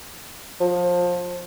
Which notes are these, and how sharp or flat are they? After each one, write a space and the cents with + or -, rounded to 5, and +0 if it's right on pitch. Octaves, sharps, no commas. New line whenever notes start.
F3 +20